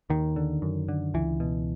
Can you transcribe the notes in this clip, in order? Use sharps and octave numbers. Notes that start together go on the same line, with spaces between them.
D#2 D#3
D3
F#2
D3
C#2 E3
B2